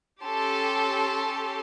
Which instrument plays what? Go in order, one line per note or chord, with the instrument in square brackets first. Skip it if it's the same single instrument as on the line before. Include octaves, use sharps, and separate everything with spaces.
[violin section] C#4 G4 A4 C6